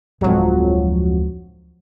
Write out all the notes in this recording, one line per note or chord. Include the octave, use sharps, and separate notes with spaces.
D1 F2 F3 F#3 G#3